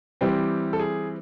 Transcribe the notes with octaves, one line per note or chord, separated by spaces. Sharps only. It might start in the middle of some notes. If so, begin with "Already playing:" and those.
E3 G3 C4 G4
A4
G#4